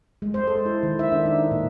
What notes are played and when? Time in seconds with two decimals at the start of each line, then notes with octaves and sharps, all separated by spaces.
0.22 G#3
0.34 C5
0.47 A4
0.66 E4
0.83 D#3
0.99 E5
1.12 D4
1.26 D#4
1.51 A#2